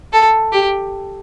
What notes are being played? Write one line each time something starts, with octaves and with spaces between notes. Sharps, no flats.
A4
G4